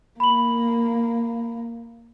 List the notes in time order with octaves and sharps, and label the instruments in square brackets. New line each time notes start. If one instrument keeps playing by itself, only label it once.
[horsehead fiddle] A#3 [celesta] B5 F#7